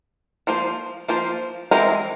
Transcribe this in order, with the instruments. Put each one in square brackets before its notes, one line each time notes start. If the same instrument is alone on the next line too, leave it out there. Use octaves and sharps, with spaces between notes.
[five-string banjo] F3 A#3 F4 C5
F3 A#3 F4 C5
E3 G#3 C4 E4 A#4